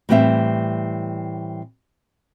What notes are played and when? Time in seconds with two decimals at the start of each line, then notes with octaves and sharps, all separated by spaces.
0.09 A2 E3 G3 C4 E5